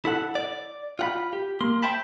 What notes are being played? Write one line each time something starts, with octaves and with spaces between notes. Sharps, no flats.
E4 A4 F#5
D5
F4 F#5 B5
G4
A#3 C6
C5 E5 G5 A5 B5